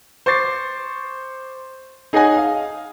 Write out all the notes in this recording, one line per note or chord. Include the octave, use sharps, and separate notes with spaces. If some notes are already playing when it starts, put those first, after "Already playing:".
C5 C#6 D6 A6 C7
D#4 G#4 C#5 D#5 F#5 G#5
F5 D#6